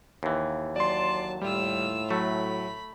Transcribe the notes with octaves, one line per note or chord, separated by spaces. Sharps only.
D#2 E3
F#3 D5 A5 C6
A2 G3 F4 E6
F#3 A3 B5